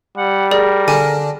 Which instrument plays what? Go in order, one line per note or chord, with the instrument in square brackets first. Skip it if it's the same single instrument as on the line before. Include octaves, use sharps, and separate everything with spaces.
[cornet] G3 [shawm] F#5
[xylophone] G#4 D5 [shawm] A#4
[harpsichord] D3 D4 [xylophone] G#5